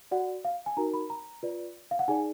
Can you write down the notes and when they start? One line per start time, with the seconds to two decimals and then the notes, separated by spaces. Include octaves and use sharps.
0.11 F#4 D5 F#5
0.45 F5
0.66 G#5
0.77 D#4 F#4 A#4 A#5
0.94 B5
1.10 A#5
1.43 F4 B4 D5
1.91 F5
1.99 F#5
2.08 D#4 G#4 D5 G#5